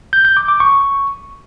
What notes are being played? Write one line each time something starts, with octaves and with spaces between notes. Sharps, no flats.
G6
G6
D6
D6
C#6